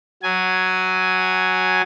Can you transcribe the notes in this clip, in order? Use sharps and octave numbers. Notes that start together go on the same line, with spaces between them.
F#3 G#5